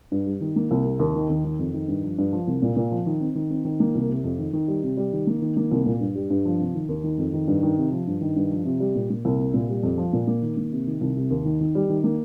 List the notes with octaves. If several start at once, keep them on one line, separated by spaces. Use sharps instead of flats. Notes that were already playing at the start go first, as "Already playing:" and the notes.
G2
G3
D#3
A#3
C2
C3
D#2
D#3
D#2
D#3
F2
D#3
G2
F3
G2
F3
C2
A#2
A#2
F3
D#3
C4
D#3
C4
D#3
A#3
C2
C3
F2
D#3
D#3
G3
C3
G3
D#3
A#3
D#3
A#3
C2
A#2
G2
G3
G2
F3
C3
D#3
D#2
D#3
F2
D#3
G2
D#3
C3
F3
G2
D#3
G2
F3
C3
G3
A#2
A#3
C2
C3
A#2
G3
F2
F3
A#2
A#3
D#3
A#3
C3
D#3
C2
C3
D#2
D#3
D#3
G3
D#3
A#3